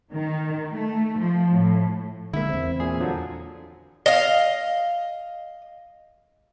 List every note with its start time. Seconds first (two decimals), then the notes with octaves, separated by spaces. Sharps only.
0.13 D#3
0.73 A3
1.19 F3
1.53 A2
2.33 D3 G#3 A#3 E4 E5
2.49 E2 C4
2.80 A#2 G#4
3.00 D3 F3 F#3
4.06 D#5 F5